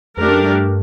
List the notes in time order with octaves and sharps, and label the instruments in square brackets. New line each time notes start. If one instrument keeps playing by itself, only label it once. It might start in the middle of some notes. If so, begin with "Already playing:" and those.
[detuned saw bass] F2 [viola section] A3 D4 G4 A#4
[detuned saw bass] F#2
G2